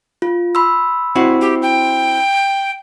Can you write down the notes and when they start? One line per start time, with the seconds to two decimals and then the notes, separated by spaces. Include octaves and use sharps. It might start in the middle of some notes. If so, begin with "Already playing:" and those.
0.22 F4
0.55 B5 C6 E6
1.16 C4 E4 F#4
1.41 G4
1.62 G5